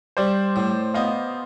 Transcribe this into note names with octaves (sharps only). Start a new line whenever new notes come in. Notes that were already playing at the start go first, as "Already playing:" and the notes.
G3 C5 D5
A2
B3 D#5 F5